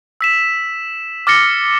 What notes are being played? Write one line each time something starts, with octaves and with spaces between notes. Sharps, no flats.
E6 B6 E7
D6 F6 A6 A#6 C#7 G7